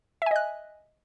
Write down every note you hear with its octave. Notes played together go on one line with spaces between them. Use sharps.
D#5 E5 G#5 F#6